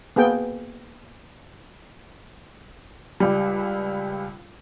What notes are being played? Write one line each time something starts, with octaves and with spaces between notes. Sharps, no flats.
A#3 B3 G#4 G5
C#2 G3